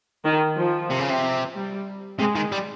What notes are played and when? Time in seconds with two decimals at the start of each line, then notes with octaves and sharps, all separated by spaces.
0.25 D#3
0.56 F3
0.90 C3
0.99 C#3
1.10 C3
1.55 G3
2.19 C3 G#3
2.36 D#3
2.52 G3